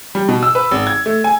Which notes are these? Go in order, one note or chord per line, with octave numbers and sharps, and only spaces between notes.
G3
B2
E6
B4
G#1
G#6
A3
G#5